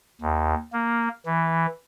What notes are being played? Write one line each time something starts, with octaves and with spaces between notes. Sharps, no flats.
D#2
A#3
E3